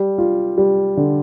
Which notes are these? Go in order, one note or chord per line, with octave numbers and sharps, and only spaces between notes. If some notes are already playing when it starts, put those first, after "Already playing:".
Already playing: G3
F4
G3
D3